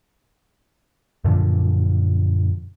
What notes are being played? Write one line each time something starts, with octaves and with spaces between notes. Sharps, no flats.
F#2 A#2 D3 F3